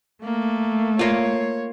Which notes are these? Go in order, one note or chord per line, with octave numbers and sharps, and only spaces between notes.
A3 A#3
A#3 F4 C#5